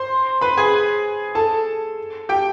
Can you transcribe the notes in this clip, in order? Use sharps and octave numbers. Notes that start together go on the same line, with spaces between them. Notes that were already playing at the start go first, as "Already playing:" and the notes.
Already playing: C5 C6
B4 B5
G#4 G#5
A4 A5
G4 G5